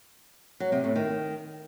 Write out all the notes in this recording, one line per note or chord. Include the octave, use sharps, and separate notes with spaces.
F#3
C3
A2
D#3